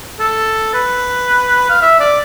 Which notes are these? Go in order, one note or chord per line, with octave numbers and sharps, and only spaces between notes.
A4
B4
F5
E5
D5